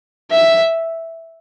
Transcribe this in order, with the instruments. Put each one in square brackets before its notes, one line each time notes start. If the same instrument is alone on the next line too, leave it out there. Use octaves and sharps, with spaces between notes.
[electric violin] E5